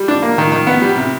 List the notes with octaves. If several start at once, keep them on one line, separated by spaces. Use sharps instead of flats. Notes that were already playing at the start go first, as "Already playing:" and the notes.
Already playing: G3
D4
A#3
D#3
D#3
B3
G3
C3